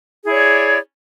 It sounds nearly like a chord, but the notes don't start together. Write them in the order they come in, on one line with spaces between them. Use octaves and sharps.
G#4 E4 C#5 D5